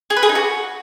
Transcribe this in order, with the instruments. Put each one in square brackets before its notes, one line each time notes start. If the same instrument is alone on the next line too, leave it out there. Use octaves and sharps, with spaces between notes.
[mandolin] G#4
B4
G#4
D#4
F#4